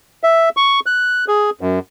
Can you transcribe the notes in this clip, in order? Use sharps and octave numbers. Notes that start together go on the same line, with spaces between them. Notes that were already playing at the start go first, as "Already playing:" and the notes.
E5
C#6
F#6
G#4
F#2